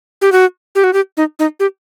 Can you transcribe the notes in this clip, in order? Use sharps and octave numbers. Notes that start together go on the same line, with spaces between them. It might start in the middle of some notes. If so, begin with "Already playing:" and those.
G4
F#4
G4
F#4
G4
D#4
D#4
G4